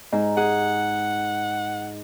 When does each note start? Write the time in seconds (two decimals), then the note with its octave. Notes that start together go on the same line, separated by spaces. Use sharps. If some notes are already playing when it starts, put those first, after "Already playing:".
0.12 G#2
0.37 G#4 F#5